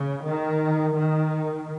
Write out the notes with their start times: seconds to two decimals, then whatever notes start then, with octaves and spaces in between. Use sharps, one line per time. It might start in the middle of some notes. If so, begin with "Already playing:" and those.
Already playing: C#3
0.26 D#3
0.95 D#3